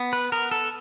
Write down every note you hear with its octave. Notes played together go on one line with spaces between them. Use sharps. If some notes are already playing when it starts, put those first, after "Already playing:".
Already playing: B3
B4
B3 A#4
A4